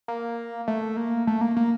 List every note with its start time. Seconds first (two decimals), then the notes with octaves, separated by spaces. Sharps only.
0.08 A#3
0.68 A3
0.97 A#3
1.27 A3
1.41 A#3
1.57 A#3